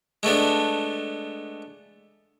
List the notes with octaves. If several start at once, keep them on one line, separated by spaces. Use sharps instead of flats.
G#3 A3 B3 D4